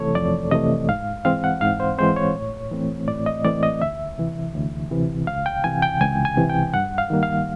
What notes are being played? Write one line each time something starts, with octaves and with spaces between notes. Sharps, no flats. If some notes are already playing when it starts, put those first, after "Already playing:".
Already playing: F2 C3 E3 A3 A4 C#5
F2 D5
C3 E3 A3 D#5
G#2 F5
E3 G#3 C4 F5
F#5
G#2 F5
C5
E3 G#3 C4 C5
C#5
A2
E3 A3 C4
A2 D5
D#5
E3 A3 C4 D5
D#5
D2 E5
C3 E3
D2
C3 E3
C#2 F5
G5
C3 E3 G#5
G5
C#2 G#5
G#5
C3 E3
G5
G2 F#5
F5
D#3 G3 A#3
F5